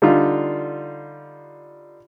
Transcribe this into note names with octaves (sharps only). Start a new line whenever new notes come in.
D3 G3 D#4 F4